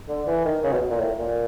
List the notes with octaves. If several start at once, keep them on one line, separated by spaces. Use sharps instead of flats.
D3
E3
D#3
C#3
B2
A#2
A2
A#2